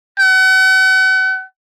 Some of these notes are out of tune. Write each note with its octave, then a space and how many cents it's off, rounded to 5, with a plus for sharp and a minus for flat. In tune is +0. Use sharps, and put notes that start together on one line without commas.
F#5 +40